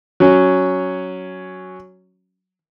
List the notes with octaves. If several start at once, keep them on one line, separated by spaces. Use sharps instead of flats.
F#3 C#4